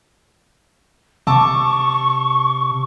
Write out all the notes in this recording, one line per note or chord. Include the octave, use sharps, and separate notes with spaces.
C3 A5 C#6 D6 E6